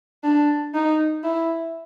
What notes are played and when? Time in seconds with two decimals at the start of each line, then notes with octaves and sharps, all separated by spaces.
0.24 D4
0.74 D#4
1.24 E4